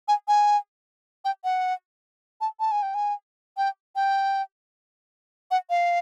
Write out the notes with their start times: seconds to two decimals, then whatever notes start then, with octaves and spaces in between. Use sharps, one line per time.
0.08 G#5
0.28 G#5
1.25 G5
1.44 F#5
2.41 A5
2.60 A5
2.72 G#5
2.83 G5
2.95 G#5
3.57 G5
3.96 G5
5.51 F#5
5.70 F5